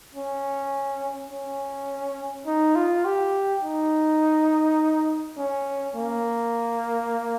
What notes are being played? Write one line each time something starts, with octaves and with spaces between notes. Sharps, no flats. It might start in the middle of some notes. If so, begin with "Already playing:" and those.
C#4
C#4
D#4
F4
G4
D#4
C#4
A#3